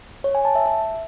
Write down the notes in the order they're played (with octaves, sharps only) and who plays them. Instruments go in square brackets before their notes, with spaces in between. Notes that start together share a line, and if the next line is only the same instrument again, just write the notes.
[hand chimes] C#5
G#5
A5
E5
E5